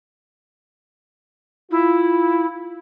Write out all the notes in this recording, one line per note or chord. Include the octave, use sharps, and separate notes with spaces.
E4 F4